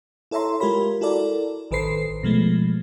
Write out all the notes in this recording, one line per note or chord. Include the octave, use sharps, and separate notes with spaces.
E4 A4 C#5 E5 A#5 C6
G#3 F4 G4 A#4 B5
E4 F#4 A4 A#4 D5
A1 D#3 A4 B4 C5 C7
B2 F3 G#3 A3